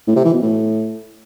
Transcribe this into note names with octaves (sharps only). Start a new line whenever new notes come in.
A2
C3
E3
B2
A2